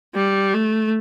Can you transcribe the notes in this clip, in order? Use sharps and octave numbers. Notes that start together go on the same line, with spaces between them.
G3
A3